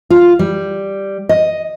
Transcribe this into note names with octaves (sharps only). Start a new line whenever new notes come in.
F4
G3
D#5